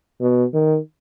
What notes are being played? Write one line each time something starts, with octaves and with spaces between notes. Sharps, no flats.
B2
D#3